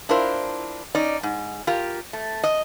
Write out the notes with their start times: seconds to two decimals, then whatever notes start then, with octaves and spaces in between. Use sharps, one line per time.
0.09 D4 E4 F4 A#4 C5
0.95 C#4 D#4 D5
1.23 G#2
1.67 F4 G4 A#4
2.13 A3
2.44 D#5